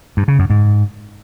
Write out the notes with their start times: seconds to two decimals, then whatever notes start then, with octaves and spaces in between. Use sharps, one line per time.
0.17 G2
0.28 C#3
0.39 F#2
0.50 G#2